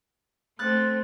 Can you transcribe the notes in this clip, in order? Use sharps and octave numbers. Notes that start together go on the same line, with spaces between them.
A3 C4 F#6 A6